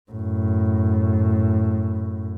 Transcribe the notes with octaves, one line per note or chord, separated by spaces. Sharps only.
F#2 A2